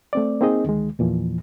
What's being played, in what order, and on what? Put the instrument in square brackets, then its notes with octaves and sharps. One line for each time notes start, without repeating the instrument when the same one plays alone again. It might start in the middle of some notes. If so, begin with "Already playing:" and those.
[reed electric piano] A3 C4 D5
A#3 C4 D#4 G#4 D#5
D2 D#3 G#3
E2 A#2 E3 F3